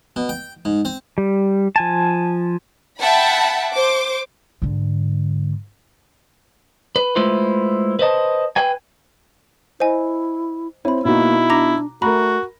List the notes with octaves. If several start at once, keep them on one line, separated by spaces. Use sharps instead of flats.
B2
G5
G#2
C4
G3
F3 G#5 A5
E5 F#5 G5 A5 B5
C5 D6
G#2 D3
B4
G#3 A3 E4 F4 B4 C5
B4 C5 D#5 A5
B4 G5 G#5
E4 C5 D#5 G#5
C4 E4 C5 C#5 B5
B2 A#3 D#4 E4 F#4
D4 A#5 D6 A#6
A3 F#4 A#4 A#5 B5